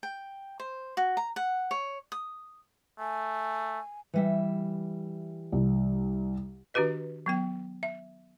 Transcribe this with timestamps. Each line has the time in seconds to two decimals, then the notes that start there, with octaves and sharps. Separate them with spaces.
0.03 G5
0.60 C5
0.97 F#4
1.17 A#5
1.36 F#5
1.71 C#5
2.12 D#6
2.99 A3 G#5
4.14 E3 G3 E5
5.52 C2
6.74 D#3 D4 F#4 G4 B4 D#5
7.26 F#3 B3 G5
7.83 E5